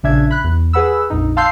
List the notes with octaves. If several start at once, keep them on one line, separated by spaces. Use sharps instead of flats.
A#1 C#3 D4 E5 G#6
B5 F#6
E2
G#4 B4 F#5 B5 E6
A#1 F2 D#4
F5 A5 C6 E6 G6 C7